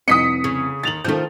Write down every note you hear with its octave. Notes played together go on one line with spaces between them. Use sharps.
F1 C2 D#5 D#6 B6 C#7
C#3
D#2 D#3 A6 F7 F#7
D#3 F3 A3 G6